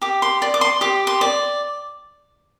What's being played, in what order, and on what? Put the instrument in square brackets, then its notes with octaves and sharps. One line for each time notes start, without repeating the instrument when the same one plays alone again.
[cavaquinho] G4 D6
C6
D5
D6
C6
G4 D6
C6
D5